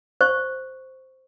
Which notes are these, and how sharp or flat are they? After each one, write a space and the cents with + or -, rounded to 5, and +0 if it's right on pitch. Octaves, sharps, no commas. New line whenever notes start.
C5 +0 C#6 +0